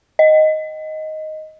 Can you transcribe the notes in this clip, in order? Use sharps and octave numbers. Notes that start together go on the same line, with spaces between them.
D#5